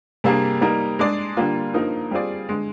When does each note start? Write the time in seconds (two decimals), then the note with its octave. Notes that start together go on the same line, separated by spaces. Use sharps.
0.24 C3 G3 A#3 D4 G#4
0.61 G3 A#3 D#4 A#4
0.99 G#3 D4 G#4 D5
1.37 D3 G3 A#3 F4
1.74 G2 F3 A#3 D#4 A#4
2.11 G3 C4 F4 G#4 D5
2.49 D3 G#3